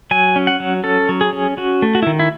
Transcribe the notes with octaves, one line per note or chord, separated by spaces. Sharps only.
F#3 G#5
C#4
F#5
F#3
C#4 A4
F#3
G#4
C#4
C#4 F#4
A3
F#4
E4
D#3
E4